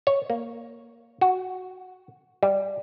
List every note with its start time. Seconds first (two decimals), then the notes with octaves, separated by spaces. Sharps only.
0.07 C#5
0.30 A#3
1.21 F#4
2.43 G3